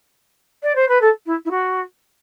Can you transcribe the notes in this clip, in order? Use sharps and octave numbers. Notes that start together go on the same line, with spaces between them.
D5
C5
B4
A4
E4
E4
F#4